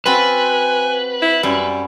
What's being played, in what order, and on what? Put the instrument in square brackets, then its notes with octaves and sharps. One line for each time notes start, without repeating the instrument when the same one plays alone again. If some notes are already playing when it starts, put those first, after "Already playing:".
[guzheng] C4 F4 F#4 [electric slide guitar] B4 [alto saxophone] G#5
[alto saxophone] E4
[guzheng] F#2 E4 [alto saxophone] G3